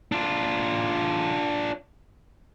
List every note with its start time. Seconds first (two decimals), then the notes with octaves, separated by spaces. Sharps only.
0.12 D4 F4